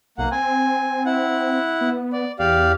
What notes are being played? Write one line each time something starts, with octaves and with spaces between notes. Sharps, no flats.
B1 A#3 F#5
C4 G#5
E4 F#5
B3
D5
E2 G4 D5 F5